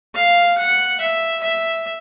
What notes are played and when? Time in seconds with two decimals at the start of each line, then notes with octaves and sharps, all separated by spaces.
0.15 F5
0.58 F#5
1.01 E5
1.43 E5